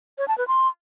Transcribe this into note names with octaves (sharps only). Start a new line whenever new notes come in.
C#5
A5
B4
C6